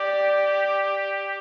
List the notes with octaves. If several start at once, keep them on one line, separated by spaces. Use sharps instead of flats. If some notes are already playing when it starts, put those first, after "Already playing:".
Already playing: G4 D5